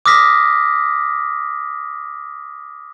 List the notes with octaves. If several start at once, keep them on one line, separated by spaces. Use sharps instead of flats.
D6 D#6 F6 A#6 B6